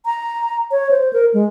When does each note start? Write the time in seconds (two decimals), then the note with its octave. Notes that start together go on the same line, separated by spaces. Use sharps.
0.06 A#5
0.71 C#5
0.91 C5
1.13 A#4
1.34 G#3